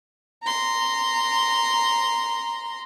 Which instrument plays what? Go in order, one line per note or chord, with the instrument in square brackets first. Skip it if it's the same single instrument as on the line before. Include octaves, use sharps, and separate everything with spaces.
[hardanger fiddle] A#5 C6